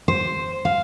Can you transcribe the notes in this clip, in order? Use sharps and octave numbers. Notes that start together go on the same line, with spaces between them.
C5
F5